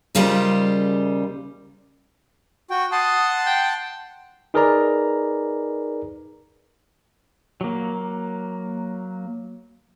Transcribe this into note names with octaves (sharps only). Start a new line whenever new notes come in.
D#2 C#3 G3 F4 G#4 C5
F#4 G5
F#5 A5 C6 D#6
G5
D#4 G#4 A#4 B4 D5 A#5
F#3 A#3